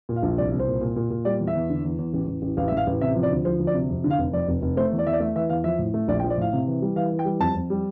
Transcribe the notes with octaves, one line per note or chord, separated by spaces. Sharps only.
A#2
F5
A#1
C2 D5
C2
C5
A#2
A#2
A#2
A#2
G3 D5
E2
E5
E2
D3
E2
E2
A1
A1
A1
A1 F5
A1 E5
F5
A1
C3 E5
F3
D5
D2
F3 C5
D2
D5
C3
F2
D3
F5
F1
F2 D5
F1
F1
A3 C5
E2
D5
E2 E5
D5
A3 E5
E3 E5
E2 F5
F3 E5
A2
A3
A#1 D5
G5
F3
D5
A2 F5
C3
E3
G3
E3 F5
E3
G5
G3
F2 A5
F2
G3